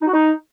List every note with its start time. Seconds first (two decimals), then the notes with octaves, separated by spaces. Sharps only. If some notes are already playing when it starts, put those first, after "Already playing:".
0.02 D#4
0.08 F#4
0.13 D#4